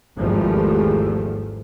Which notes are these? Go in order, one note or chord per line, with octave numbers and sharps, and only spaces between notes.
G#1 E2 F3 G3 A3